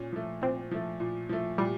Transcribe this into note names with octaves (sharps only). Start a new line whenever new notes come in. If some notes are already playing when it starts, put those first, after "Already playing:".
Already playing: A#2 C#4
F3 A3
A#2 C4
F3 A3
A#2
F3 A3
A#2 G3